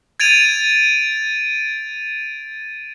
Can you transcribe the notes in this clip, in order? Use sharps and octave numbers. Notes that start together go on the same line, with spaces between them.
G#6 A6 D7 D#7 F7